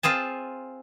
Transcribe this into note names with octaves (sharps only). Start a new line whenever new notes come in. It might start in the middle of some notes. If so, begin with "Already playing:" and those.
C4 F4 G#4 A5